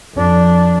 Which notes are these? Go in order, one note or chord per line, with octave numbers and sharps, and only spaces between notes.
F2 D4